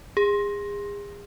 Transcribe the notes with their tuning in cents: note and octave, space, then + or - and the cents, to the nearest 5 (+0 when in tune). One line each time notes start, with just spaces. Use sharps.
G#4 -35